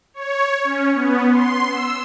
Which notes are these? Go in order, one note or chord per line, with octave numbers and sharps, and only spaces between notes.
C#5
C#4
B3
C6
E6